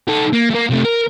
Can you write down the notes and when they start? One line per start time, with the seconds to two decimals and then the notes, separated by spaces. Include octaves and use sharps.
0.08 D#4 A4
0.33 A#3
0.51 A3 A#3
0.70 C3 A3
0.85 A#4